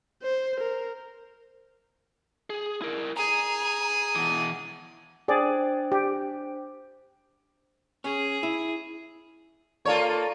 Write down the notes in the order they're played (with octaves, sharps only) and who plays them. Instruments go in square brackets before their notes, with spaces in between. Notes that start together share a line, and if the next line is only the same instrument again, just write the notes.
[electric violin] C5
A#4
[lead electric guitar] G#4
E4 A#4
[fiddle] G#4 D#6 [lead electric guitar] A#5
[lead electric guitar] B2 E3
[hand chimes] D4 C5 G5 [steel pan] G#4 D5
[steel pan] G4
[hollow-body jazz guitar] C#4 [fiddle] G#4
[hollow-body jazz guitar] E4
[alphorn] A#3 [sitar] F4 A4 C#5 [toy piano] D5